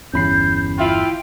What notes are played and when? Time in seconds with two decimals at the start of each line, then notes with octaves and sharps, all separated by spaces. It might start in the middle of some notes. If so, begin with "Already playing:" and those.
0.14 G1 E2 C#4 B5 G6 C7
0.78 E4 F4 G5